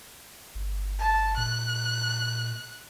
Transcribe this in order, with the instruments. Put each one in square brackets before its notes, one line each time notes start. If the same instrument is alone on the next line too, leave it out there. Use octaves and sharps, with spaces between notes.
[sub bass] G1
[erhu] A5
[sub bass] A#2 [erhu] F#6